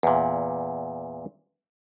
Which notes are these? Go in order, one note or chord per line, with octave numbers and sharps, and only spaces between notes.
E2 A#2